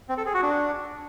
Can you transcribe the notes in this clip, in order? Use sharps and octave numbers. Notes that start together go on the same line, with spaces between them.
C4
A4
G#4
F#4
D4